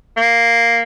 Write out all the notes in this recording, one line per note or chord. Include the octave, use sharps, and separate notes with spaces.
A#3